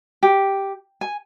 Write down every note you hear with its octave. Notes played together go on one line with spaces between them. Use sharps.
G4
G#5